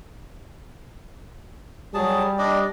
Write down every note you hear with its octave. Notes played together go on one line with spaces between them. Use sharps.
F#3 G3 G#4 A5
D4 D5 D#5